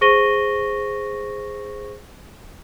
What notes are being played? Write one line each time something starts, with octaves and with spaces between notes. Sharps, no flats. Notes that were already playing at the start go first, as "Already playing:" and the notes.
G#4 C5 C#6 A#6 D#7 G7